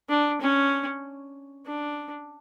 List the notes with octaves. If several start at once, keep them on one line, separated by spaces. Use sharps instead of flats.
D4
C#4
D4